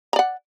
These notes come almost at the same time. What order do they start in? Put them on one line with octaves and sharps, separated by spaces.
A#5 D5 F#5